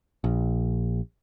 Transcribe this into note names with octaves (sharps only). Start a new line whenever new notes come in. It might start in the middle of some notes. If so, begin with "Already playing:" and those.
A#1